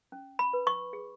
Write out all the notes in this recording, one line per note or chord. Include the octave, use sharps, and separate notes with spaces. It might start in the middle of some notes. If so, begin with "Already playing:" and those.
C#4
B5
B4
C#6
G#4